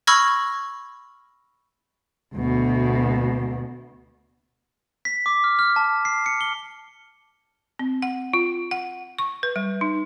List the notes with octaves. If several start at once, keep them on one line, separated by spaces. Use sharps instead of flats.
B5 C#6 E6 F6 G#6 A#6
D2 B2
B6
D6
F6
F6
A5
C7
C#7
G7
C4
F#5
F4
F#5
C#6
B4
G3
D#4